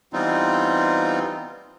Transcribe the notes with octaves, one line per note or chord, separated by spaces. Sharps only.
E3 G3 B3 C4 D#4 F4